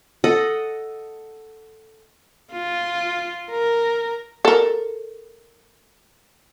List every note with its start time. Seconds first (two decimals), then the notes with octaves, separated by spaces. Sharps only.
0.24 A4 D#5 F#5
2.52 F4
3.51 A#4
4.45 A4 A#4